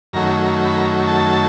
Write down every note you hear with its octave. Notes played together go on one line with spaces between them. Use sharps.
F#2 D#3 F#3 A3 A#5
A#5
B5
A#5
A5